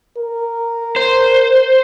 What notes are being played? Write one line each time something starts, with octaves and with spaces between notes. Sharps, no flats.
A#4
C5